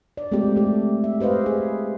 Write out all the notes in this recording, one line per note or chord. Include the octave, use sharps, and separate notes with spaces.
D5
G#3 A3 C4 F4 G4
A3 G4
E5
G4 B4 C5 D#5 F5
G#4